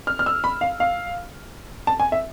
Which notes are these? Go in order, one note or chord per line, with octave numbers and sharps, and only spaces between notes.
F6
F6
E6
B5
F5
F5
A5
G#5
E5